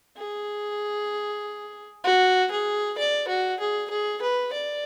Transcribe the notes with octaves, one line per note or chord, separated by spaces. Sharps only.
G#4
F#4
G#4
D5
F#4
G#4
G#4
B4
D5